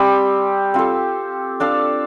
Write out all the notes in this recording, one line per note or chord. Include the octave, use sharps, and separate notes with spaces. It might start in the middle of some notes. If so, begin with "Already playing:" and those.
Already playing: G3 C4 G4
C4 F4 A4
D4 A4 D5 F5